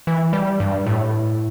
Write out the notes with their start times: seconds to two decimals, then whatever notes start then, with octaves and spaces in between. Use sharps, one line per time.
0.07 E3
0.33 G3
0.60 G2
0.86 A2